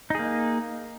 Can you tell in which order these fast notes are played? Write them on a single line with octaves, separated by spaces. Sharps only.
D#4 G#4 A#3